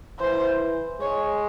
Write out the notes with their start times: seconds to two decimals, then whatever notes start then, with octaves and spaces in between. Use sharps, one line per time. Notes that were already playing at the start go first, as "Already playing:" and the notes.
0.20 E3 C5
1.00 G#3 C#5